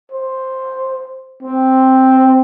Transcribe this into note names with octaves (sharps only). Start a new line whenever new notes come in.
C5
C4